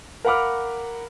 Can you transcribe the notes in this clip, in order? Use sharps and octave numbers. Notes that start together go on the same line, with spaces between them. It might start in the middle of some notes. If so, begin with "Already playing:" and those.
A#4 F5 F#5 B5 D6 F6